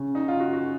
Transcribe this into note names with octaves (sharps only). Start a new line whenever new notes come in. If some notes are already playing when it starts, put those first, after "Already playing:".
Already playing: C#3
D#4
F4
F#4
F#4